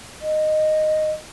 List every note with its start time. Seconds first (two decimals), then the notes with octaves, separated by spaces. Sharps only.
0.21 D#5